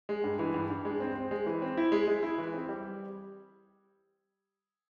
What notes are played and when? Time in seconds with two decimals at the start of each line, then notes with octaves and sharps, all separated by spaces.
0.09 G#3
0.24 G2
0.39 E3
0.54 G2
0.70 G2
0.85 G#3
1.00 C4
1.15 C4
1.31 G#3
1.46 E3
1.62 C4
1.77 E4
1.92 G#3
2.07 G#3
2.23 E4
2.38 E3
2.54 C4
2.69 G3